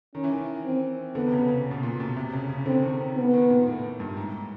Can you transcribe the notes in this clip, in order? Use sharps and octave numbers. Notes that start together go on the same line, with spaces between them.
D#3 C#4
E3
D#3
C4
D3 B3
C3
C#3
C#3
B2
A#2
B2
C3
C#3
C#3
D3 C4
D#3
B3
D#3
A#2
A2
G2
G#2